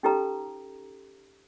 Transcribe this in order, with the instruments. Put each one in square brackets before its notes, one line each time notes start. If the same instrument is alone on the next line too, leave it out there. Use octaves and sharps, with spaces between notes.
[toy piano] C#4 D#4 G4 A4 B4 A#5